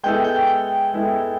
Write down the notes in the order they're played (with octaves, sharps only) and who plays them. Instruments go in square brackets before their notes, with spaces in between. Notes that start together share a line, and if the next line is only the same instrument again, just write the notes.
[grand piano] G#3 B3 E4 A4 [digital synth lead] G5
[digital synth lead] G5
[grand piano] G#3 B3 E4 A4